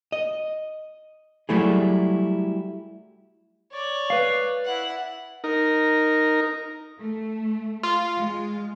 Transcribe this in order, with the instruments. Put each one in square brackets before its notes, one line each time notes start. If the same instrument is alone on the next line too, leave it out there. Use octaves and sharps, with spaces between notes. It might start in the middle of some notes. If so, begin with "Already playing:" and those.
[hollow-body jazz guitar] D#5
F#3 G3 A3 E4 G#4
[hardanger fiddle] C#5 D5
[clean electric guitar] B4 F5
[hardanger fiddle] E4 F#5
[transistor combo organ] D#4 A#4
[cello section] A3
[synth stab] F4
[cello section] G#3